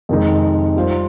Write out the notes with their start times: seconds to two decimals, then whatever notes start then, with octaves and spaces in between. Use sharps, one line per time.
0.09 F2 C3 D#3 G#3 D#4
0.76 G3 C4 F4 C5